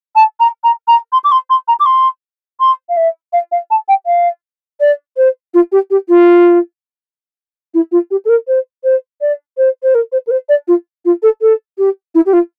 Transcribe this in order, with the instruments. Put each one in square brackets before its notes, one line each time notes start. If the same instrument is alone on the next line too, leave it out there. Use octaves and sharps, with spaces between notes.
[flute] A5
A#5
A#5
A#5
C6
D6
C6
C6
A#5
D6
C6
C6
F5
E5
F5
F5
A5
G5
F5
D5
C5
F4
G4
G4
F4
E4
F4
G4
A4
A#4
C5
C5
D5
C5
C5
A#4
C5
A#4
C5
D5
F4
F4
A4
A4
G4
E4
G4
F4